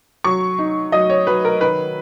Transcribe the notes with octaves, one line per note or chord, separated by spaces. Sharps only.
F#3 C#6
D#4
F#3 D#5
C#5
F#3 B4
A#4
D#3 B4